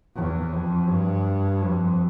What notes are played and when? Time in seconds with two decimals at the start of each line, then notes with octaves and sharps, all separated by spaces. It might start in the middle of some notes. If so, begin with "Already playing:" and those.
0.15 E2
0.52 F2
0.89 G2
1.63 F2